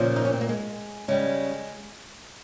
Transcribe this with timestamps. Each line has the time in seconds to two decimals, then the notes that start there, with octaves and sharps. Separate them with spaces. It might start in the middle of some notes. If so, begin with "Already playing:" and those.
Already playing: A#2 C#3 F3 A#3
0.16 D#4
0.25 C#4
0.33 C4
0.41 A#3
0.49 G#3
1.08 C#3 G3 G#3